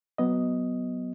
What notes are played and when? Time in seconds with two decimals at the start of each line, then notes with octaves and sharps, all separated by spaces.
0.18 F#3 B3 D#5